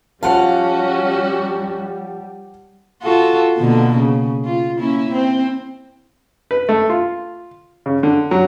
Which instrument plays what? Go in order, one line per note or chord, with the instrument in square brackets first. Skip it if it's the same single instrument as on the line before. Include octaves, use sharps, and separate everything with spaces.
[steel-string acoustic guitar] F3 F5 [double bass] G3 [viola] C#4 F#4 [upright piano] F#5 A5
[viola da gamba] F4 F#4 A4
B2 D3 A#3
C#3
F4
A#3 C#4 E4
C4
[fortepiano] B4
A3
F4
C#3
D3
F#3